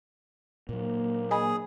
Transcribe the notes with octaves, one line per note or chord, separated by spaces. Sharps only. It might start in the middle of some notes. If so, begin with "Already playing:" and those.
A#2 F#3 A#3
G#4 D#5 G#5 B5